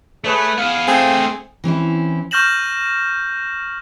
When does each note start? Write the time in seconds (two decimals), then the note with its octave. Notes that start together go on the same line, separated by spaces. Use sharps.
0.24 A3 G#4 B4 C#5
0.58 B3 G#4 F5
0.88 A3 C4 G#4 C5
1.64 E3 C4 C#4 E4
2.31 C#6 F6 G6 A#6 E7 F#7